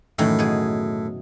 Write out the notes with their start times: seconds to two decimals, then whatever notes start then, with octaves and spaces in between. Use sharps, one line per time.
0.19 F#2 A2 D#3 E3
0.39 B2 G#4